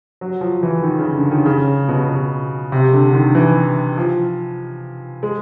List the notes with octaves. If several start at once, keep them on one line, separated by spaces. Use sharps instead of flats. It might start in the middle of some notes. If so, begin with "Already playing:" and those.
F#3
F3
E3
D#3
C#3
D3
D#3
C#3
B2
B2
C3
D3
D3
D#3
E3
F3
G#3